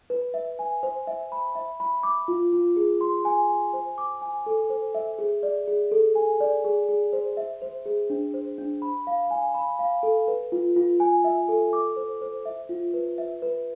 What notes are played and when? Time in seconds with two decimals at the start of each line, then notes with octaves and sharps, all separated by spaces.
0.10 B4
0.34 E5
0.59 G#5
0.83 C5
1.07 E5
1.32 B5
1.55 E5
1.80 B5
2.03 D6
2.28 F4
2.53 F4
2.76 G#4
3.01 C6
3.25 G#5
3.49 G#5
3.73 C5
3.98 D6
4.22 G#5
4.46 A4
4.70 C5
4.95 E5
5.19 G#4
5.43 D5
5.67 G#4
5.92 A4
6.15 G#5
6.41 D5
6.64 G#4
6.89 G#4
7.13 C5
7.37 E5
7.62 C5
7.85 G#4
8.10 D4
8.34 C5
8.58 D4
8.82 B5
9.07 F5
9.31 G#5
9.54 B5
9.79 F5
10.03 A4
10.28 B4
10.52 F4
10.76 F4
11.00 G#5
11.24 E5
11.48 A4
11.73 D6
11.97 C5
12.21 C5
12.45 E5
12.69 F4
12.94 B4
13.18 E5
13.42 B4